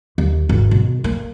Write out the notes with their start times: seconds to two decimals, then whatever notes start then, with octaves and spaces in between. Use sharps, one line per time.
0.18 D#2
0.49 G#1
0.71 B2
1.04 A#3